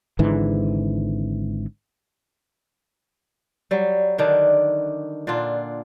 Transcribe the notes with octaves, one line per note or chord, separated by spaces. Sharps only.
G#1 G#2 D3 E3
F#3 G3
D3 D#3 D4
A#2 D3 D4 F4